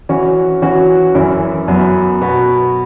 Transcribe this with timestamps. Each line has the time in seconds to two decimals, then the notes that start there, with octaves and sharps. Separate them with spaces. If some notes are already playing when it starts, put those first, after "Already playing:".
0.09 E3 C#4 F#4
0.62 E3 C#4 F#4
1.14 F#2 E3 C#4 E4
1.68 F#2 F#3 B3
2.21 B2 B3 F#4